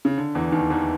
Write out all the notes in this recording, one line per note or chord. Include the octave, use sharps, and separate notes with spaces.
C#3
D3
E2 E3
D#2 D#3
E2 E3